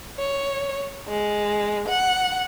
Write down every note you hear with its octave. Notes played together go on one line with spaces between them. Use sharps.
C#5
G#3
F#5